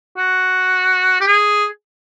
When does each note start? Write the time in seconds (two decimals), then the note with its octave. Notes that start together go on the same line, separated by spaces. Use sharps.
0.17 F#4
1.20 G4
1.27 G#4